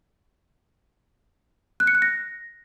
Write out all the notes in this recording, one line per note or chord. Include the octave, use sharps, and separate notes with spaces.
F#6
C#7
F#6
A#6